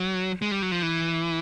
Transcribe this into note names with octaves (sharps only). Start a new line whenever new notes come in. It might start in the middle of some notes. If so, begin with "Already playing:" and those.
Already playing: F#3
G#3
G3
F#3
F3
E3